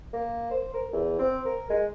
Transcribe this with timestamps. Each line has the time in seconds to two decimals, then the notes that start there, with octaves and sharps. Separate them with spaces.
0.13 A#3
0.51 C5
0.74 A#4
0.93 E2
1.19 C4
1.45 A#4
1.70 G#3